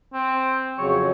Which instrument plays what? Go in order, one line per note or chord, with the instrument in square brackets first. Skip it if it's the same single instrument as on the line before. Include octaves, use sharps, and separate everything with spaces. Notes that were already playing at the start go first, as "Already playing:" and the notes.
[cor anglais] C4
[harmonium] F2 C#3 F#3 [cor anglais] C#5